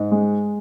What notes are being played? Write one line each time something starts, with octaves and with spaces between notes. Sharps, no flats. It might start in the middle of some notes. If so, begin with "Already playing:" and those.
Already playing: G#2
G#3